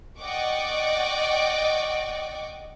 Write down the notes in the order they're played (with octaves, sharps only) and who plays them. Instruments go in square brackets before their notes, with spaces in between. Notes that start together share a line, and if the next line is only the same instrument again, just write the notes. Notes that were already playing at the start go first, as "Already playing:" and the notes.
[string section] D5 D#5 F#5 G5 C#6 D6